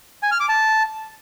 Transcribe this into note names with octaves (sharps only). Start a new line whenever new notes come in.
G#5
F6
D6
A5